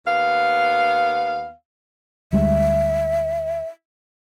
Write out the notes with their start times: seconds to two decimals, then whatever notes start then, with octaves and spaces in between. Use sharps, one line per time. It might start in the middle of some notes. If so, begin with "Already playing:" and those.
0.05 D#2 B3 F5
2.33 D2 G3 G#3 E5